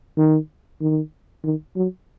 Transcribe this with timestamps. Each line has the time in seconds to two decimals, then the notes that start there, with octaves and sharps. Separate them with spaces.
0.18 D#3
0.81 D#3
1.44 D#3
1.76 F#3